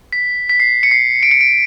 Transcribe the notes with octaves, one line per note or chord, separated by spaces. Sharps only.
B6
B6
C7
C#7
C7
D7
C#7
D7